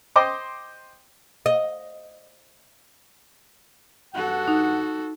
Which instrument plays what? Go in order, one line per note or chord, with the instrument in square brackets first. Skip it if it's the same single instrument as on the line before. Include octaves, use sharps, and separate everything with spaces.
[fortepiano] C5 D#5 G5 C6 D6
[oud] D#5
[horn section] G2 F#5 [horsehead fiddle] F#4 A4
[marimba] D#4